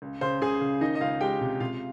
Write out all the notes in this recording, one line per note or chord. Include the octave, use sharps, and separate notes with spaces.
C#2
C#3 C5
C#2 G#4 G#5
C#3
D#3 D#4 D#5
D#5
C#2 F4 F5
G#3 G4 G5
C3
C3 F4 F5